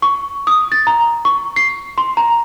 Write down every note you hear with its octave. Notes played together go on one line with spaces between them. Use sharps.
C#6
D#6
A6
A#5
C#6
C7
C6
A#5